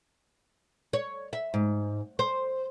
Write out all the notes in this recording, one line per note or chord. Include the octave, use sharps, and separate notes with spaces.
C#5
E5
G#2
C5